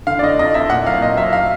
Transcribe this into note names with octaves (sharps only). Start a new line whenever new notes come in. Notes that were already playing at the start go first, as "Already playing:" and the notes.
D3 F5
D5
D3 D#5
F2 D#5
F2 E5
A#2 F#5
F#3 F5
A#2 D#5
F#3 E5
F5